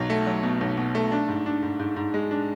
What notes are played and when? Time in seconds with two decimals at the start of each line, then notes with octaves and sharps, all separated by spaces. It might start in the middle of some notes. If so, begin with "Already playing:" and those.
Already playing: B1 F#3
0.10 A3
0.27 F#3
0.43 B2
0.61 B1
0.77 B2
0.95 A3
1.12 D4
1.28 G#2
1.46 D4
1.63 G#2
1.79 G#2
1.96 G#2
2.14 G#3
2.31 D4